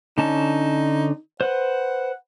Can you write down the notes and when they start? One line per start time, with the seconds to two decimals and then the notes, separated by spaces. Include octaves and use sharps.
0.18 D3 C#4 D#4 A5
1.41 B4 C5 F#5